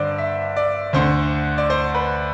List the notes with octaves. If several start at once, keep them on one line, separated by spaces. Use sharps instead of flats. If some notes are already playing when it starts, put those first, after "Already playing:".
Already playing: G2 D3 C5 D5
E5
D5
D2 D3 C5
D5
C5
B4